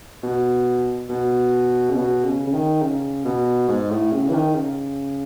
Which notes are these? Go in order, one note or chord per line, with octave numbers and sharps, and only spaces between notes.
B2
B2
C#3
B2
C#3
C#3
D#3
C#3
B2
G#2
A2
C#3
E3
D#3
C#3